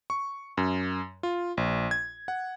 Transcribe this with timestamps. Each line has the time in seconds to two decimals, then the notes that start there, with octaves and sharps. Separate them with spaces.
0.10 C#6
0.57 F#2
1.23 F4
1.57 A#1
1.91 G#6
2.28 F#5